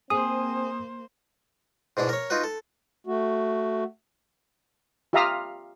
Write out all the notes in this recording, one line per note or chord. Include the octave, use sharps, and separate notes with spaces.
A#3 C4 G#4 C5 D#6
G#2 B2 D4 E4
A#4 C#5
D#4 F4 F#4 B4
A4
A3 F#4
F4 G4 E5 F5 A#5 D#6